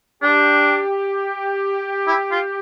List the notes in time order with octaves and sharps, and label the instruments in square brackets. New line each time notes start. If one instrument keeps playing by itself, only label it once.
[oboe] D4 [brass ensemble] G4
[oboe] E4
F4